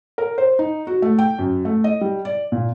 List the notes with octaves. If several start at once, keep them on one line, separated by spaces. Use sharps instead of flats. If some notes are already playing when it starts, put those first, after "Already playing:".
A#4
C5
D#4
F#4
A3
G5
F#2
A3
D#5
G3
D5
A#2